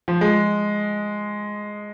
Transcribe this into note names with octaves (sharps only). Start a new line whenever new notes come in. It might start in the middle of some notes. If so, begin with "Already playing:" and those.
F3
G#3